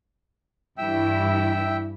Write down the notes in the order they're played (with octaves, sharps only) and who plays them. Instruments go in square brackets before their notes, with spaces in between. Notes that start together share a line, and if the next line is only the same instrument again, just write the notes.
[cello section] G2 E3 E4 [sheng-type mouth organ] E5 G5 E6